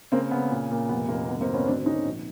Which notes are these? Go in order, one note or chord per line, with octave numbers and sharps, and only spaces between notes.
C#3 A#3 C4
C#3 B3
A#2
A#2
F1 B3
F1 A#3
G#1 B3
A#3 C4
G#1
B3 C#4
D2 C4 D4
D3 C#4 D#4
A#1